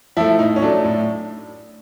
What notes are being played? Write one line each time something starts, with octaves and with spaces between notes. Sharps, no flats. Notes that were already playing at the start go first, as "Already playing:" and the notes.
F3 A3 E4
A2 D#4
C#4
F#3 A3 D4
A2